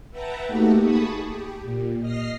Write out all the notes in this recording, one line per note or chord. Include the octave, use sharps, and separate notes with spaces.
B4 E5 F#5 G5 A5 A#5
A3 A#3 D#4 F#4 G4 A4
G#4 A5 B5 C#6 D#6
G4
A#2
D#5 F6 A#6 C7